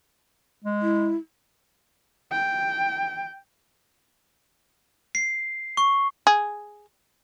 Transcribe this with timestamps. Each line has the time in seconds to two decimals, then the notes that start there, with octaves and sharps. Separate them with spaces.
0.64 G#3
0.82 E4
2.32 G5
5.15 C7
5.77 C#6
6.27 G#4